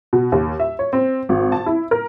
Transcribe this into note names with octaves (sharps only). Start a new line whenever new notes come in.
B2
D#2
E5
C#5
C4
G#1
A5
E4
A#4